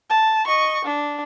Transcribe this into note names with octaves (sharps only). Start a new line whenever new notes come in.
A5
D#5 C#6
D4